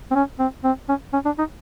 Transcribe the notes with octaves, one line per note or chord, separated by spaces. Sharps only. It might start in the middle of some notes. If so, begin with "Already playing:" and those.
C4
C#4
C4
C4
C#4
C#4
D4
D#4